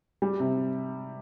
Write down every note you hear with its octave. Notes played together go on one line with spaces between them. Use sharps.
G3
C3